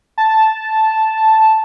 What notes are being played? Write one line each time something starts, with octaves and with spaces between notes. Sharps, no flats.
A5